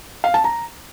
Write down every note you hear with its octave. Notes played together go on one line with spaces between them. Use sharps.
F5
A5
A#5